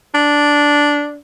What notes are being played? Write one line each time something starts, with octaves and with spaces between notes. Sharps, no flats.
D4